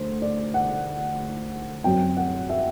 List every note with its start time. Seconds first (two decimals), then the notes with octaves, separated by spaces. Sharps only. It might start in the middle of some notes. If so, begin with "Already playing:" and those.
Already playing: D2 D3 C5
0.22 D5
0.54 F#5
1.84 F#2 F#3 C4 G5
2.17 F#5
2.50 E5